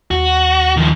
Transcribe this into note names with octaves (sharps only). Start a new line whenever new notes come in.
D#2 F#4
D#3 F3